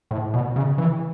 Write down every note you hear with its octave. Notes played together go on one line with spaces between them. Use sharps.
A2
B2
C#3
E3